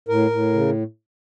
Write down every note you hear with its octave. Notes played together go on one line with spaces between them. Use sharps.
A2 A#4
A2
C#3